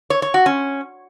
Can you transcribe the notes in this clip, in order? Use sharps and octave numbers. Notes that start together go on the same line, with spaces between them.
C#5
C#5
F#4
C#4